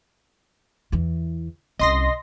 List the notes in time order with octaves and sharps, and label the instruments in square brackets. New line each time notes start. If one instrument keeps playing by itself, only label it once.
[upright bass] E2 E3
[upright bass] C2 C#4 [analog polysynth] D#5 C6 A#6